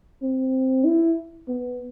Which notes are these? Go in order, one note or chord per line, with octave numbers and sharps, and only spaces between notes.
C4
E4
B3